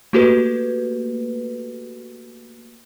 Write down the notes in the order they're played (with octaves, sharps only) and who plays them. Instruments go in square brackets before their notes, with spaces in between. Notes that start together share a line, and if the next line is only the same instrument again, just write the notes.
[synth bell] A3 A#3 F#4 G4 A4 B4